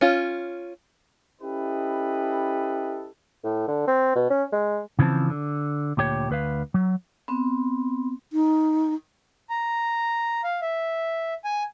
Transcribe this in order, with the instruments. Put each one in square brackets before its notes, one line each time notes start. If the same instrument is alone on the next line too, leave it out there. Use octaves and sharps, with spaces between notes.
[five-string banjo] C#4 F4
[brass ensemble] C#4 E4 G4 A4 B4 D#5
[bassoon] A2
D3
C4
B2
C#4
G#3
[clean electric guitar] C#3 E3 F3 C4 A5
D3
D2 A#2 G4 C#5
D2 B4 F5
F#3
[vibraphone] B3 C4
[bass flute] D#4
[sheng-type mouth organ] A#5
F5
E5
G#5